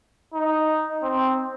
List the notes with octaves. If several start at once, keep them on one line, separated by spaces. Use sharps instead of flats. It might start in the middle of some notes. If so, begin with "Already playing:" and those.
D#4
C4